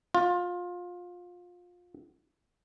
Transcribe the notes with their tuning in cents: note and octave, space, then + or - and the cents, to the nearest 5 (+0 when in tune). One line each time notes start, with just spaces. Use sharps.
F4 +20